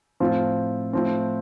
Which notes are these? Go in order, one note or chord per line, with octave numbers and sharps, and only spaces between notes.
A2 F3 C4 F4
A2 F3 C4